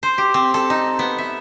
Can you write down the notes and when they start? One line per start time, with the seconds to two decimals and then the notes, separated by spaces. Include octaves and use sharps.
0.03 C5
0.18 G4
0.34 C4
0.54 A4
0.70 D#4
0.99 B3
1.18 E5